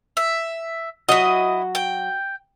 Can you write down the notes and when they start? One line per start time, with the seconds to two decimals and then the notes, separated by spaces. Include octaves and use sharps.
0.17 E5
1.09 F#3 E4 F#4 D#5
1.75 G5